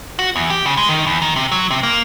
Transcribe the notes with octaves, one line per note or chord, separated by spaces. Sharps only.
F#4
E2
G4
C#3
G#3
D#3
E2
D#3
C3
F#3
C3
A#3